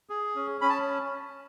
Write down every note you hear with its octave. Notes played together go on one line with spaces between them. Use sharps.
G#4
C#4
C#4 B5
A5